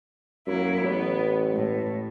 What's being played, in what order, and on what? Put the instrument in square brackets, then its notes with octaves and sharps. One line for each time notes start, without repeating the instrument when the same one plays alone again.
[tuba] F#2 [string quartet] F#3 A#3 E4
[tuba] A1 [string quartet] B3
[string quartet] A2